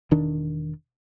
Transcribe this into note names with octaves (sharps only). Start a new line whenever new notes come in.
E1 D#3 D4